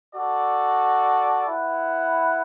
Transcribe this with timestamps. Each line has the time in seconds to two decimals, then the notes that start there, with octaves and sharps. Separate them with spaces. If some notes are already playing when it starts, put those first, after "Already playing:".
0.13 F#4 A4 D5
1.45 E4 B4 F#5